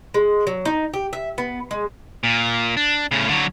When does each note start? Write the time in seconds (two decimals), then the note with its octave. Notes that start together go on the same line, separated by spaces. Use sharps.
0.14 G#3
0.47 F#3
0.65 D#4
0.94 G4
1.13 E5
1.38 B3
1.71 G#3
2.24 A#2
2.77 D4
3.11 A2 C#3
3.29 D3 F#3